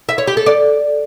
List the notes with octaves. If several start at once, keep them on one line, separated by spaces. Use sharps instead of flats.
E5
C#5
G4
A4
D5